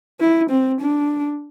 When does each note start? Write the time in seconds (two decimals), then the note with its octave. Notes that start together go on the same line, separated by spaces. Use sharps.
0.20 E4
0.50 C4
0.81 D4